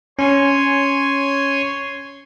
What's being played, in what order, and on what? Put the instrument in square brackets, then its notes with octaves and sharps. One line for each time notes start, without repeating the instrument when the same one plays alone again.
[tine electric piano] C#4 [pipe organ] C#5 G#5 C6